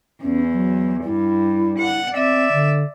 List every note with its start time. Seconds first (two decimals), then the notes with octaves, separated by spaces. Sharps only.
0.21 E2 C#4
0.52 F#3
1.04 G2 E4
1.78 F#5
2.14 C4 D5 E5
2.52 D3